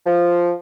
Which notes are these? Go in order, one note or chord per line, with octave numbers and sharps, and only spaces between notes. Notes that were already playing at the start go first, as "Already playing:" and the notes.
F3